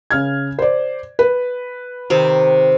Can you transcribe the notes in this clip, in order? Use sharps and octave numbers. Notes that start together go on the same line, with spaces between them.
C#3 F6 G#6
C5 D5
B4
C3 D#3 C4